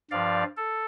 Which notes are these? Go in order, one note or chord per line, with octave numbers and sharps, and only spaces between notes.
G2 F3 D5 F5
A4